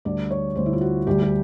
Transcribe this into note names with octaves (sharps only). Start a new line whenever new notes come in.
D2 D3 G3 D5
C#5
D2 D3 G3 C5
E4
F4
F#4
D2 D3 G3 G4
G4